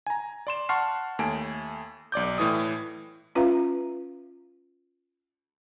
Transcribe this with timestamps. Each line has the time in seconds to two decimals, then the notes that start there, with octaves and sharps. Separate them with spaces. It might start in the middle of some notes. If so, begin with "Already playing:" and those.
0.06 G#5 A#5
0.47 D5 C6 E7
0.69 F#5 A5 C6 C#6 F6 C7
1.19 D#2 A3 G#5 D7
2.12 B1 D5 D6 G6
2.38 A2 E3 D#6
3.35 C#4 F4 B4 E5 F5 A#5